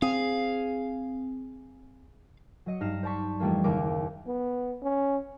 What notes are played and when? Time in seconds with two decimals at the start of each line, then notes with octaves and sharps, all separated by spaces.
0.02 C4 G#4 F5
2.66 F#3 D#5 C#7
2.81 G2 D#4 F6 A#6 C7 E7
3.03 C5 D5 A5 C#6 B6
3.40 F2 E3 G3 A3 A#3
3.64 F#1 D#2 A#3 A#4 D6
4.27 B3
4.83 C#4